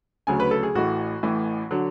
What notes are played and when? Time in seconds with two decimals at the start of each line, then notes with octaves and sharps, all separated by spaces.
0.27 D2 C#3 F#3 G#5
0.40 B4
0.51 A4
0.63 G#4
0.75 A1 A2 E3 F#4
1.23 A1 A2 E3
1.71 D3 F#3